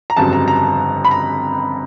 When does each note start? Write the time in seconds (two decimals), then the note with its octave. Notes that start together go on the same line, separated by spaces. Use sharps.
0.10 A#5
0.16 G1 F2 C#3 F#3 A5
0.33 A#5
0.48 A#5
1.05 B5
1.11 A#5